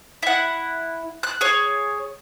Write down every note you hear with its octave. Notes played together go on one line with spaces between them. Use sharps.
E4 F#5
F#6
G#4 C#5